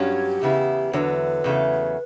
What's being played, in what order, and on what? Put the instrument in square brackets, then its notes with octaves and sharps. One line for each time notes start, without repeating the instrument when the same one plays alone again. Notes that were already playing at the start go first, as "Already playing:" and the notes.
Already playing: [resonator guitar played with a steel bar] G2 F#3 C#4 [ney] G4
[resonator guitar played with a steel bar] E2 C#3 B3 E4
[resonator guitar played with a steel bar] E2 D3 F#3 [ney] B4 C#5
[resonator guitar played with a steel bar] E2 C#3 F#3 A3